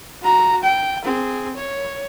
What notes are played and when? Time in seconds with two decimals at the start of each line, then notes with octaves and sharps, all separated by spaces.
0.23 F#4 A#5
0.63 G5
1.04 C4 G#4
1.57 C#5